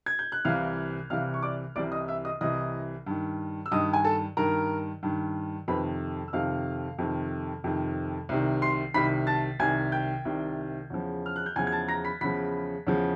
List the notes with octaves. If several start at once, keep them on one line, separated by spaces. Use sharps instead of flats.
G#6
G6
F#6
C2 C3 E3 F5 F6
C2 C3 E3 F5 F6
C#6
D5 D6
C2 C3 E3 D5 D6
D#5 D#6
E5 E6
D#5 D#6
C2 C3 E3 D#5 D#6
G2 D#3
E6
G2 D#3 D#5 D#6
G#5
A4 A5
G2 D#3 A#4 A#5
G2 D#3
F2 C3 D#3 B4 B5
E6
F2 C3 D#3 F5 F6
F2 C3 D#3
F2 C3 D#3
C2 C3 D#3
C6 C7
C2 C3 D#3 B5 B6
A5 A6
C2 C3 D#3 G#5 G#6
G5 G6
C2 C3 D#3
E2 C#3 F3
F6
F#6
G6
E2 C#3 F3 G#5 G#6
G#6
A5 A6
A#5 A#6
B5 B6
E2 C#3 F3 B5 B6
E2 C#3 F3